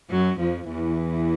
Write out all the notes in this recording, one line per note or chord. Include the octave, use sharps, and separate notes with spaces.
F#2 F#3
F2 F3
E2 E3